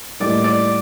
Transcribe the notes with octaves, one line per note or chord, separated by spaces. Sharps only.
A2 G3 A#3 D#4 D5
D5